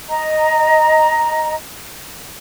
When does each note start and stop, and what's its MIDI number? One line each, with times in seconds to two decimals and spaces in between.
0.09 1.55 75
0.09 1.55 82